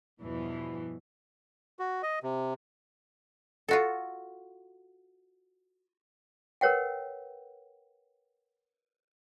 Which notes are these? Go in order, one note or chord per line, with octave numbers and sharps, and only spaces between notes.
E2 G2 B2 E3 F3
F#4
D#5
C3
F4 F#4 A4
A#4 B4 C#5 F#5 G5